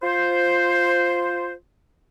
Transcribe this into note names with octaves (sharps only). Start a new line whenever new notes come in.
F4 C5